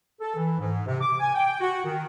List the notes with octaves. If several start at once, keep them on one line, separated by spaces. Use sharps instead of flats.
A4
E3
G#2
C3
D6
G#5
G5
F#4
D#3